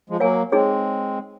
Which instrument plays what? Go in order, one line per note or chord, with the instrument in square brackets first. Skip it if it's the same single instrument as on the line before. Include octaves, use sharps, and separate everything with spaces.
[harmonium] F3 G#3
[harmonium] F#3 A#3 [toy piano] A#4 C#5 F5 G#5
[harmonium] G#3 C4 [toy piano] D#4 G#4 C#5